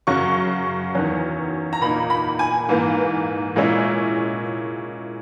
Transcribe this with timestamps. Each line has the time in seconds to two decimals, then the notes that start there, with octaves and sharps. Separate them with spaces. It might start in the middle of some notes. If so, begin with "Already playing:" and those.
0.07 F#2 C#3 F#3 C#4 C#6
0.95 E2 D#3 F#3 C#4
1.73 A#5
1.81 A#2 A#3 D#4 B5
2.10 B5
2.39 G#5
2.69 G#2 E3 A#3
3.56 A#2 G#3 C#4 E4